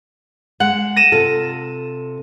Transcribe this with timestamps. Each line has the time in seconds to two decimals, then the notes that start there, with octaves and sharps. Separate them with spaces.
0.60 G#3 F#5
0.96 A#6 D#7 E7
1.12 C3 F4 A4